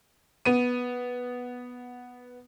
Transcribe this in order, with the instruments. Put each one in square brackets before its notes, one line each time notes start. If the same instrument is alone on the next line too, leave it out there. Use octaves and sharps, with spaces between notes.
[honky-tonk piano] B3 D#7